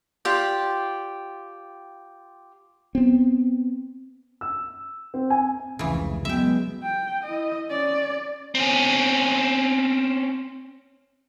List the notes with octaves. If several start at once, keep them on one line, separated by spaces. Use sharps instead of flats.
F4 G4 D5 G5
B3 C4
E6
C4
G#5
F1 C#2 C#3 E3
F#3 G#3 B3 E5 G5
G5
E4 D#5
C#4 D5
C4 C#4